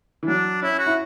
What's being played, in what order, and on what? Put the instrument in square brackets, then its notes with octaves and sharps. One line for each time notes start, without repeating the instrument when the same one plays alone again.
[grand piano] E3
[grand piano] F#3 [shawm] D4
[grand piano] C#4 [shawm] E4
[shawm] F#4
[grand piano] E4